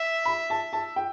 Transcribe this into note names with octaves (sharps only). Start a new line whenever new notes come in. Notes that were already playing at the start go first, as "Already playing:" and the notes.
Already playing: E5
B5
A5
A5
G5